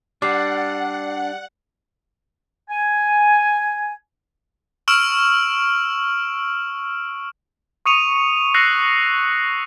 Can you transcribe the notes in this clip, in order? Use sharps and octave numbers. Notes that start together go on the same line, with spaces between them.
G3 D4 F#5 D6 C7
G#5
C#6 E6 F6 D7 E7 F#7
C#6 D#6 C#7 D#7 F7
E6 F#6 A#6 C7 C#7